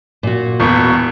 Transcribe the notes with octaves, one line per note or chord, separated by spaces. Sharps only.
A#2 F#4
E1 B2